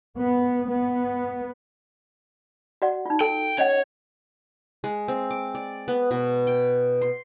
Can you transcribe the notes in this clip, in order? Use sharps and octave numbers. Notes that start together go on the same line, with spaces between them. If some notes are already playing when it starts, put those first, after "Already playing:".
B3
B3
F#4 D5 F#5
D#4 F4
A4 G5
C#4 C#5 D#5 F#5
G#3
C4
D6
D5
B3
B2
G5
C6